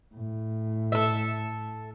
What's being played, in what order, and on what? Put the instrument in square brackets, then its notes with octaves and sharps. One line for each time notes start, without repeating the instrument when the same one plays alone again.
[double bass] A2
[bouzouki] A4 E5